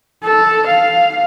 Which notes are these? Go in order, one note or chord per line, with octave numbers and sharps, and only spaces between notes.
A4
F5